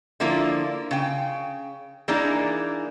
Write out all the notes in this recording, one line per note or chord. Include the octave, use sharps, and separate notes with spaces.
D3 F3 A#3 E4 F4
C#3 G5
E3 A#3 D4 D#4 G#4 A#4